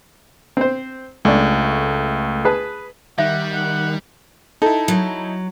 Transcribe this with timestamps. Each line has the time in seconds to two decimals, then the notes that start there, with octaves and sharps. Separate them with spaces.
0.57 C4 C5
1.25 C#2 G#3 A3 D4
2.45 G#4 B4 A5
3.19 D#3 G3 E5 F#5
3.53 F#5
4.62 D#4 E4 A4
4.88 F#3